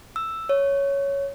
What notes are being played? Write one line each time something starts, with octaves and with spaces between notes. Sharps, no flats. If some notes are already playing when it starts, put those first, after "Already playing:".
E6
C#5